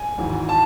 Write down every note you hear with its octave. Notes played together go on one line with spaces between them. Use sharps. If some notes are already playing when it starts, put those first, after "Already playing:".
Already playing: G#5
G#1 G#2 E3
A5